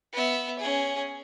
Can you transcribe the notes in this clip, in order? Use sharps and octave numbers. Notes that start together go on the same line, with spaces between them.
B3 E5
C#4 G#4